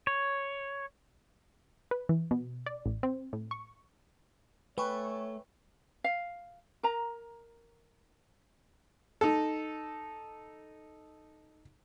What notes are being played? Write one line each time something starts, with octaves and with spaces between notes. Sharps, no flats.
C#5
B4
E3
B2
D5
A1
C4
A2
C#6
A3 B4 C#5 G5 G#5 C#6
F5
A#4 A#5
D#4 A4